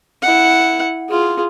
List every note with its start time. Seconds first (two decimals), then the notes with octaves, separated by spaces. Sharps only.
0.22 E4 F#5
1.09 F4 G#4